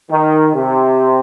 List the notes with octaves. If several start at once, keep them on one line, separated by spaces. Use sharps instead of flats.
D#3
C3